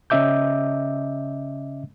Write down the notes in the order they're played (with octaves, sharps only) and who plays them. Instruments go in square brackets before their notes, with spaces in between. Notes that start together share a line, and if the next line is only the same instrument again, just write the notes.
[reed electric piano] C#3 C#4 D#5 E5 D6 G6